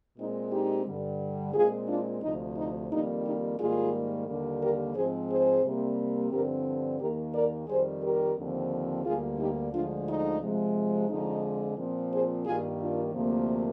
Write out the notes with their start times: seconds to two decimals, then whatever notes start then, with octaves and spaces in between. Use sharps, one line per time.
0.17 A#2 G#3 C4 D#4
0.51 D#4 G4
0.86 G2 D3 G3
1.54 A#2 G#3 C4 F4 G#4
1.88 D4 F4
2.22 D2 C3 F3 D#4
2.56 D#4
2.91 F2 D#3 G3 A#3 D#4
3.25 D#4 G4
3.59 G#2 D#3 G3 A#3 F4 G#4
4.27 D#2 D3 G3 A#3
4.61 G4 A#4
4.95 G#2 F3 G#3 C4 G#4 C5
5.30 G#4 C5
5.64 C3 G3 A#3
6.32 G2 D3 F3 C4 G4 A#4
7.00 D#2 D#3 A#3 G4 A#4
7.34 A#4 D5
7.68 F2 D#3 G3 G#4 C5
8.02 G4 A#4
8.37 D#2 D3 F3 C4
9.05 D2 D3 G3 A#3 F4 G#4
9.39 D#4 G4
9.72 D2 D3 F3 G#3 D4 F4
10.07 D#4
10.41 C3 F3 G#3
11.09 F2 D3 F3 G#3 D#4
11.78 A#2 F3 C4
12.12 G#4 C5
12.46 G2 D#3 G3 A#3 F4 G#4
12.80 D4 F4
13.14 D2 C3 F3 A#3